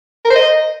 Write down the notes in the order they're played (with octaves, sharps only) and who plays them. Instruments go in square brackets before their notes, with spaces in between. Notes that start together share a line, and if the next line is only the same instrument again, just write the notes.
[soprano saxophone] A#4
C5
D#5